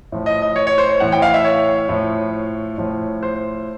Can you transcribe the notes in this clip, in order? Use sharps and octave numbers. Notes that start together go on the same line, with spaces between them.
A2 F3
D#5
D#5
C#5
C#5
C5
C#5
A2 E3 F#5
G5
F5
E5
C#5
A2 F3
A2 F3
C5